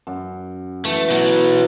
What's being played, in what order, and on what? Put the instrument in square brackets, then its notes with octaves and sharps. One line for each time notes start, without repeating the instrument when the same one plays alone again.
[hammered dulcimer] F#2
[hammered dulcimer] E3 [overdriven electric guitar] A3
[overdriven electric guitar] B2 F#3